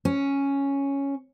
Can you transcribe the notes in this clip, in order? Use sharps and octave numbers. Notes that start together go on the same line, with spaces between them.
C#4